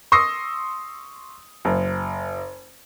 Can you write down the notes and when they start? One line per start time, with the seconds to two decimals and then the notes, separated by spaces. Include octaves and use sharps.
0.12 C6 C#6 D#6 E6 A#6 C7
1.65 F#1